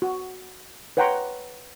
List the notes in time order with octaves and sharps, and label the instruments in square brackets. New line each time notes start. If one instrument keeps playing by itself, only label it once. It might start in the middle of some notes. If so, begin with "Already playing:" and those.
[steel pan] F#4
B4 C#5 F#5 G5 A#5 C6